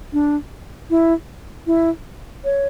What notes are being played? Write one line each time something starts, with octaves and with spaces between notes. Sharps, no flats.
D4
E4
E4
C#5